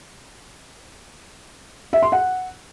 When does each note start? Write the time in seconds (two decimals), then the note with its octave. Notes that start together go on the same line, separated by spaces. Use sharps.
1.93 E5
2.02 C6
2.12 F#5